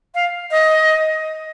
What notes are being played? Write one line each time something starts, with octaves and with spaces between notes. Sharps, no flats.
F5
D#5